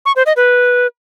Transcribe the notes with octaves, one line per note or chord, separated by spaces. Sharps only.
C#6
C5
D#5
B4